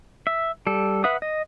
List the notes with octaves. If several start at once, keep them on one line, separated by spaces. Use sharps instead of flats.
E5
G3 A4
B4 E5 F#5 D#6
D#5